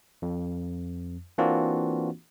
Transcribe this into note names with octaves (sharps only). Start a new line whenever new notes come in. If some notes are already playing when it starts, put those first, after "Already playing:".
F2
E3 A#3 C4 D4 F4 F#4